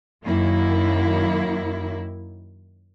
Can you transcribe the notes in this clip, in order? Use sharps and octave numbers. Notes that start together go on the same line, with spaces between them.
F#2 D#3 A#3 E4